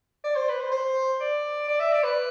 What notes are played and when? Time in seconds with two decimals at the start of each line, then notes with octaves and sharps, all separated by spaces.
0.24 D5
0.36 C5
0.48 B4
0.60 C5
0.72 C5
1.20 D5
1.68 D5
1.80 E5
1.92 D5
2.04 B4